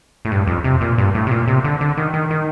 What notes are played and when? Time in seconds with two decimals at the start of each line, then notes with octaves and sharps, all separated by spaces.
0.25 A2
0.32 G2
0.47 F2
0.64 C3
0.81 A#2
0.98 G2
1.15 A2
1.27 C3
1.31 A#2
1.48 C3
1.64 D3
1.81 D3
1.97 D#3
2.14 D#3
2.30 D#3